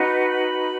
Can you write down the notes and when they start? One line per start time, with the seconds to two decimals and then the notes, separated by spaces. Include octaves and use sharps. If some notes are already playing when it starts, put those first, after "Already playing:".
Already playing: D#4 F#4 B4
0.25 B5